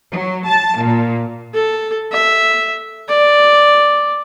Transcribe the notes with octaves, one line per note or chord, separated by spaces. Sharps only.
F#3
A5
A#2
A4
E5
D5